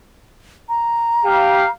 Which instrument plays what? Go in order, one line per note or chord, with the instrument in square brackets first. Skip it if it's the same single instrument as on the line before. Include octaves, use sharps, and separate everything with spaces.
[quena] A#5
[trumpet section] G4 F5